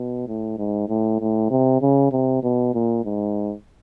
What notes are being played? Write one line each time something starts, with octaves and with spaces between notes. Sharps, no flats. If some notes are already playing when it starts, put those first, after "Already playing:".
Already playing: B2
A2
G#2
A2
A2
C3
C#3
C3
B2
A#2
G#2